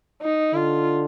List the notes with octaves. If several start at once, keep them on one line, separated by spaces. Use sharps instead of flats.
D#4
D3 F4